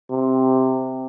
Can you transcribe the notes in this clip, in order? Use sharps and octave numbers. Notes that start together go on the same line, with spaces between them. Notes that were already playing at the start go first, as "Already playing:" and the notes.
C3